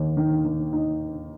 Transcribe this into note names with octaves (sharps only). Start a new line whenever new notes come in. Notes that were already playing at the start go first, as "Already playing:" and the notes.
Already playing: D#2 A#3 D#4
D#3
D#3
D#4